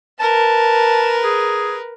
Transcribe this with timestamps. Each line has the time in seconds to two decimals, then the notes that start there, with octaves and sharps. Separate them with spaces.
0.20 A#4 B4 A5
1.24 G#4